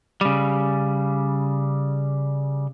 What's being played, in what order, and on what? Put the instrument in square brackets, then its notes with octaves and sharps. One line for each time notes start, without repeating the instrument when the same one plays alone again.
[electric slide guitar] C#3 G3